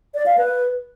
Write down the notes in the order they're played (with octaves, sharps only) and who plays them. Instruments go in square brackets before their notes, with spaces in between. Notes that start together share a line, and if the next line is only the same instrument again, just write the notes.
[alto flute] D5
F5
B4